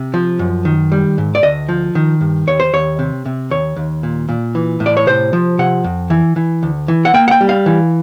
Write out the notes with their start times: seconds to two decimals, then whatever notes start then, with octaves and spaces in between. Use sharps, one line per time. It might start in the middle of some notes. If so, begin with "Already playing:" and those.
Already playing: C3
0.14 F3
0.39 F#2
0.65 D#3
0.92 G3
1.18 G#2
1.35 D5
1.43 D2 D#5
1.69 F3
1.95 D#3
2.21 G2
2.47 D#2 C#5
2.60 C5
2.73 D#2 C#5
2.99 C3
3.26 C3
3.50 D#2 C#5
3.76 D#2
4.03 A#2
4.29 A#2
4.55 E3
4.80 A2
4.86 D5
4.97 C#5
5.06 C3 C5
5.33 F3
5.58 C3 F#5
5.84 F2
6.10 E3
6.36 E3
6.63 D2
6.88 E3
7.05 F#5
7.14 A#3 G5
7.28 F#5
7.31 G5
7.41 G3
7.49 F5
7.66 E3